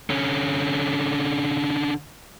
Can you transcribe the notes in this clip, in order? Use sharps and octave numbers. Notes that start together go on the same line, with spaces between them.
D3 C#4